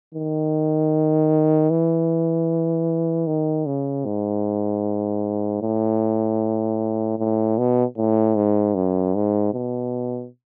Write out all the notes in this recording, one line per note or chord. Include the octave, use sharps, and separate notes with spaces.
D#3
E3
D#3
C#3
G#2
A2
A2
B2
A2
G#2
F#2
G#2
B2